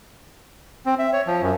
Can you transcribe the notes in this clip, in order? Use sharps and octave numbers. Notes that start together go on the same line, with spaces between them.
C4
E5
C#5
F3
F#2